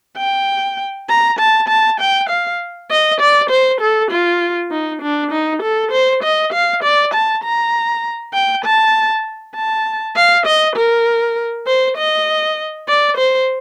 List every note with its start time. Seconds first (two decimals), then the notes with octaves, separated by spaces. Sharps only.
0.17 G5
1.09 A#5
1.39 A5
1.69 A5
2.00 G5
2.29 F5
2.91 D#5
3.21 D5
3.50 C5
3.81 A4
4.11 F4
4.71 D#4
5.02 D4
5.31 D#4
5.63 A4
5.92 C5
6.23 D#5
6.53 F5
6.83 D5
7.14 A5
7.44 A#5
8.34 G5
8.65 A5
9.55 A5
10.16 F5
10.46 D#5
10.76 A#4
11.67 C5
11.97 D#5
12.88 D5
13.17 C5